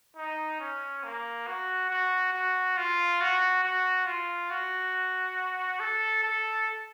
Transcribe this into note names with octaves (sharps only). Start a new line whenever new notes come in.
D#4
C#4
A#3
F#4
F#4
F#4
F4
F#4
F#4
F4
F#4
A4
A4